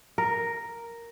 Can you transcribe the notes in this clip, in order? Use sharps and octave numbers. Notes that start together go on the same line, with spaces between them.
A#4